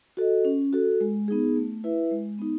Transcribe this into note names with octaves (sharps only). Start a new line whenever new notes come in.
F#4 A4 D#5
C#4
F#4 A4
G#3
B3 D#4 G#4
A3
E4 B4 E5
G#3
B3 D#4